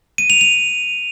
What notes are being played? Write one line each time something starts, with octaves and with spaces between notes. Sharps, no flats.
D#7
F7
F7